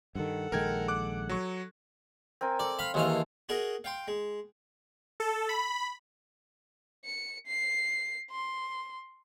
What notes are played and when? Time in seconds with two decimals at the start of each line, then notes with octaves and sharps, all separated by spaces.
0.15 G2 D#3 A4 F#5
0.52 A#1 D#3 G#3 A#4 G5 G#6
0.88 D6 F#6
1.29 F#3 C#6
2.41 C4 A#4 G#5
2.59 A4 D5
2.79 F5 B5
2.94 D#2 E3 G#3 F5 C#6 E6
3.10 A5
3.49 F#4 G#4 A#4 D#5
3.84 F5 G5 C6
4.08 G#3
5.20 A4
5.49 B5
7.05 C#7
7.47 C7
8.31 C6